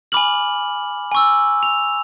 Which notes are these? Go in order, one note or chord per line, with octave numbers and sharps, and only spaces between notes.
G#5 B5 D6 F6 F#7
G#5 C#6 E6
F7